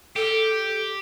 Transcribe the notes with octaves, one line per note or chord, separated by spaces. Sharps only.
G4 A4